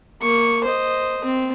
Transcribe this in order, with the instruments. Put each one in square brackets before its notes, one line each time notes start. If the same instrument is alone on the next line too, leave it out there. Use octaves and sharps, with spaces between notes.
[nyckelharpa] A#3 C#6
C5 D#5
C4